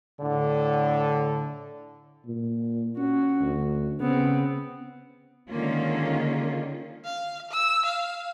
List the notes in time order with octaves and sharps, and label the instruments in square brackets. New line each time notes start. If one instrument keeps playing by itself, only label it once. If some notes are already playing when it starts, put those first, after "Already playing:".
[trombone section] A2 D3
[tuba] A#2
[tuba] C#4 [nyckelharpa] F#4
[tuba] D2
[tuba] C#3 [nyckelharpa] B3 C4
[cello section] D3 D#3 G#3 A#3 C#4 F4
[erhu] F5
E6
F5